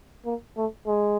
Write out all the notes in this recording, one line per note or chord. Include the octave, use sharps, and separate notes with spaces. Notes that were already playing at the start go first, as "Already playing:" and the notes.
A#3
A3
G#3